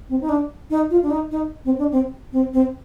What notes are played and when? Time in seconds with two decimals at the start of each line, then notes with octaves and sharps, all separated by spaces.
0.09 C4
0.21 D#4
0.29 D4
0.70 D#4
0.90 F4
1.03 D4
1.10 D#4
1.31 D#4
1.65 C4
1.78 D4
1.92 C4
2.33 C4
2.53 C4